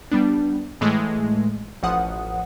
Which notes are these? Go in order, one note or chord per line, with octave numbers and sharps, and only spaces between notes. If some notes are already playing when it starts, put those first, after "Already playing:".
G3 B3 D4
A2 E3 G#3 A3
A1 F3 F#5 D#6